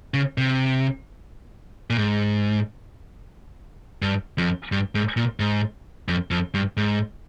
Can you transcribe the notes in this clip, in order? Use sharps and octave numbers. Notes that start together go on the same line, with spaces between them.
C#3
C3
A#2
G#2
G2
F2
G2
G#2
A#2
G#2
F2
F2
G2
G#2